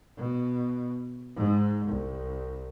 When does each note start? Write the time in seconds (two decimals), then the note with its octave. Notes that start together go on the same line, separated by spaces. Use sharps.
0.17 B2
1.36 G#2
1.87 C2